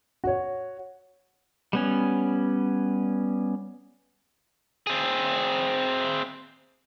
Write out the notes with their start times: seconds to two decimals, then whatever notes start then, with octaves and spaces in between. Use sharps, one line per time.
0.24 F#4 C#5
1.73 G3 B3 C#4
4.87 C4 G#4